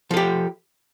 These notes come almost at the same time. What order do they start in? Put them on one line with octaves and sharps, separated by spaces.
F3 A4 G4